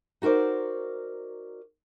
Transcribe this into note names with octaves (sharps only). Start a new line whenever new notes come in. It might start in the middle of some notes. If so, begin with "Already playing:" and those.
D#4 F#4 A#4 C5 D5